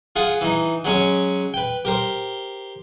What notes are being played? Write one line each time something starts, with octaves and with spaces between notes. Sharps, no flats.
F4 G#4 F#5
E3 D#4
F#3 G#3 C#4
B4 G5
G4 A#4 C5